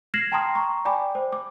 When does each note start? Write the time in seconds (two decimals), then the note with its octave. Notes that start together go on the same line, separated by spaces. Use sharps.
0.14 F6 G#6 A#6 C7 E7 F#7
0.32 G5 A5 A#5 C6 D#6 F6
0.55 A#5 C#6
0.85 D5 G5 G#5 B5 D6
1.15 C5
1.32 D6